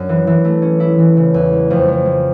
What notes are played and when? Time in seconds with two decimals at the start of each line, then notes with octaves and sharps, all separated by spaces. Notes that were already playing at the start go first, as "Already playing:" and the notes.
Already playing: F#2 D4
0.09 E3
0.27 E3
0.45 A3
0.62 C#4
0.80 E4
0.99 E3
1.17 C#3
1.34 E2
1.52 G#3
1.70 F2
1.88 G#3
2.06 G#3